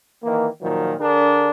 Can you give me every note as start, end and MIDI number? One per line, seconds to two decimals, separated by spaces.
0.24 0.47 51
0.24 0.47 52
0.24 0.47 58
0.62 0.95 46
0.62 0.95 51
0.62 0.95 53
0.62 0.95 54
0.99 1.51 50
0.99 1.51 62
0.99 1.51 68
0.99 1.51 70